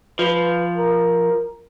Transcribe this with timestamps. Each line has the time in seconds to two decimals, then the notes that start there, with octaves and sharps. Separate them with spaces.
0.19 F3 B4
0.77 A#4